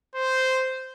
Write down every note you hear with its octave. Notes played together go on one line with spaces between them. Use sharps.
C5